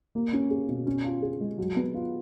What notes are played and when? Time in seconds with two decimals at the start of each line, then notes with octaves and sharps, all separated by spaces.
0.15 A#3
0.33 C#4
0.50 G#4
0.69 B2
0.86 C#4
1.04 F4
1.22 G#4
1.41 G#3
1.58 F#3
1.76 B3
1.94 F4